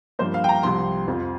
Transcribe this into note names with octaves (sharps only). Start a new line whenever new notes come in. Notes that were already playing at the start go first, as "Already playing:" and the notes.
G2 F3 A#3 C5
F5
G5
A#5
C2 C3 F3 C4 C6
F2 F3 C4 F4